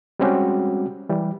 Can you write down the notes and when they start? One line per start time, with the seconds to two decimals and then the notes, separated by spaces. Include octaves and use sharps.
0.19 G3 G#3 C4 C#4 F#4 G4
1.09 E3 G3